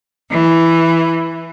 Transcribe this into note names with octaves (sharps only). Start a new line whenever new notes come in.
E3